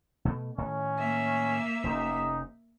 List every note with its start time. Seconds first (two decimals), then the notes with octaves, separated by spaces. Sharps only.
0.25 B2 A3
0.58 A2 D#3 C#4
0.99 A#3 E5
1.84 F1 C3 C#4 D#4